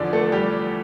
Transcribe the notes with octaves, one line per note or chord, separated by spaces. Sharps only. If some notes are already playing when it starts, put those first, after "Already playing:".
Already playing: E2 D3 F3 D4 D5
A3 A4
G3 G4